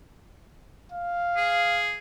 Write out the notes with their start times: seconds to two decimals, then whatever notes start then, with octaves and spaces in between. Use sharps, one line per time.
0.92 F5
1.36 G#4